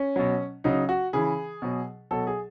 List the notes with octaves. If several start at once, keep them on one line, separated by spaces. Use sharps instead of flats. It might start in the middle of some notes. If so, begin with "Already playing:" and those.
Already playing: C#4
B2 F#3
C#3 F#3 D#4
F#4
C#3 E3 G#4
B2 F#3
B2 F#3 A4
G#4